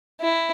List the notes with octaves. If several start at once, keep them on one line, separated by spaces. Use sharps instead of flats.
E4